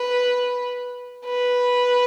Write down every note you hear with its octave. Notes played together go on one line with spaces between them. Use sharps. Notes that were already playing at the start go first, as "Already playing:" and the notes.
Already playing: B4
B4